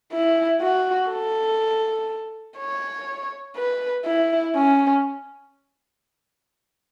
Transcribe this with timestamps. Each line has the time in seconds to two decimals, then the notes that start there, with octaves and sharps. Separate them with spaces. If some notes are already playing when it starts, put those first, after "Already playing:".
0.12 E4
0.61 F#4
1.11 A4
2.59 C#5
3.56 B4
4.05 E4
4.55 C#4